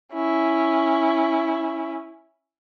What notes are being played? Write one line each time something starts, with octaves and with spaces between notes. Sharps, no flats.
C#4 E4